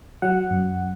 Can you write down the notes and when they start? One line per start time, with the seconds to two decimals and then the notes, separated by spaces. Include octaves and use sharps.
0.22 F#3 F#5
0.50 F#2